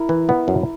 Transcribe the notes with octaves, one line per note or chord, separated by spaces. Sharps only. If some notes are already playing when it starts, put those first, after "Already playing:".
Already playing: E4 A#4
E3
B3
F#2